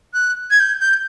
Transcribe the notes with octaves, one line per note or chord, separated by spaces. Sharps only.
F#6
G#6
G6
G6